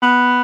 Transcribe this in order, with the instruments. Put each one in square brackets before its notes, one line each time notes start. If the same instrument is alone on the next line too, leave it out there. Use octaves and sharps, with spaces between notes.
[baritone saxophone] B3